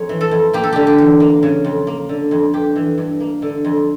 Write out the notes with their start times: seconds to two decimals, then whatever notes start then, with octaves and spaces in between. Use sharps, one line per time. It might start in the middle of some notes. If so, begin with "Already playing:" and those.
Already playing: F2 C#5
0.09 E3
0.21 A4
0.31 F2
0.53 A#3 G4
0.63 A4
0.72 D3 G4
0.87 G4
0.98 E2
1.20 A#3
1.43 C#3
1.64 F2
1.87 A#3
2.09 D3
2.31 F2
2.53 G2 G4
2.76 E3
2.98 G2
3.20 A#3
3.42 D3
3.65 F2